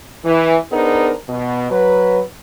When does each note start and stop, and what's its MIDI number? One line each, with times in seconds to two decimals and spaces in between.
0.25 0.56 52
0.71 1.13 59
0.71 1.13 62
0.71 1.13 63
0.71 1.13 68
0.71 1.13 70
0.71 1.13 72
1.29 1.70 47
1.71 2.21 54
1.71 2.21 71